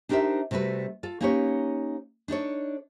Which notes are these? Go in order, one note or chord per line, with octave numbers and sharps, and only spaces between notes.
D4 D#4 G4 A#4 C5 E5
C3 G3 A3 F#4 B4
F4 A4
A#3 C#4 D#4 G4 B4 C#5
D4 D#4 A4 C#5